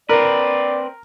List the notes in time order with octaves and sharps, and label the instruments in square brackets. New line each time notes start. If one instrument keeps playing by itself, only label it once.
[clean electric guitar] C4 B4 [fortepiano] A#4 [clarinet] D5